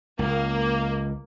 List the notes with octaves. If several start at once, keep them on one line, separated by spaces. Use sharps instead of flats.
C#2 A#3